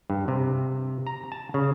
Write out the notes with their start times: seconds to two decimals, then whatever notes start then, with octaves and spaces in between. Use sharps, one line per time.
0.10 G2
0.28 C3
1.07 A#5
1.32 A5
1.54 C#3